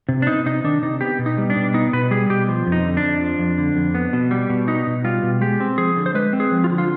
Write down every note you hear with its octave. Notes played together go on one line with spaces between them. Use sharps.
C3
D4
B3 D#4
C3 D#4
D#3 D4
C3 D#4
B3 G4
B2
D#4
G3
D4
B2
B3 D#4
B2 B4
G3 G#4
B2 G4
F3
F2
D#4
D3
D4
F2
F3
F2
D3
F2
B3
B2
G3
B2
B3 D#4
B2
G3 F4
B2
G#3 G4
C4
F3 G#4
D3
C5
G#3 B4
C4
G#4
F3
F4
D3
F4